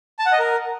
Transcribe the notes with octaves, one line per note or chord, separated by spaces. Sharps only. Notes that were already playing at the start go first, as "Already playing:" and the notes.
A5
F#5
D#5
A#4